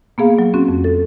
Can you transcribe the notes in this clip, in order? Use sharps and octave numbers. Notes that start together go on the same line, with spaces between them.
A#3 B3 G#4 F5
F#3
C4 C#4 F#4
F2
A4